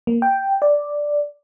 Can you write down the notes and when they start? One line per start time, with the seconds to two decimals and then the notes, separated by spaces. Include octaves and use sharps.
0.07 A#3
0.22 G5
0.62 D5